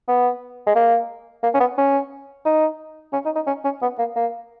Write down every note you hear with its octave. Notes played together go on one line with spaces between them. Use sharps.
B3
G#3
A#3
A#3
C#4
B3
C#4
D#4
C#4
D#4
D#4
C#4
C#4
B3
A#3
A#3